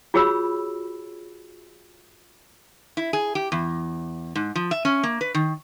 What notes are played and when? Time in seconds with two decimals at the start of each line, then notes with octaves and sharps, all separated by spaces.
0.14 F4 F#4 G#4 C#5 B5 E6
2.97 E4
3.13 G#4
3.35 G4
3.52 E2
4.36 G#2
4.55 F3
4.71 E5
4.85 C#4
5.03 A#3
5.21 B4
5.34 D#3